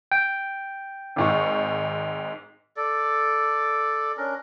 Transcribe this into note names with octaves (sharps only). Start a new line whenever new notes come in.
G5
G#1 G#2 C#6
A4 D5
C#4 D4 A#4